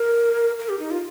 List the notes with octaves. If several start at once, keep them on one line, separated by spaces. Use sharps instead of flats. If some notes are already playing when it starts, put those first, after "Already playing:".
Already playing: A#4
A#4
G4
D#4
F4